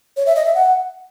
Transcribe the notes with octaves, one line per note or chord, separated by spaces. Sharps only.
C#5
E5
D#5
E5
F#5